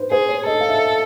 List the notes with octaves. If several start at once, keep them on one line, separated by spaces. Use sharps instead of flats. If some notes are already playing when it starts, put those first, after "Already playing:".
Already playing: B4 C5
G#4 C5
C#5
A4 D#5
F5
E5